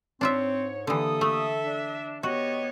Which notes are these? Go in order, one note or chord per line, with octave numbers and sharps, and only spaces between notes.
G#2 C4 D4 F4 C#5 E5
D3 E3 A#3 G4 A4 D#6
A3 E5
D4
B3 F#4 G4 C#5 D#5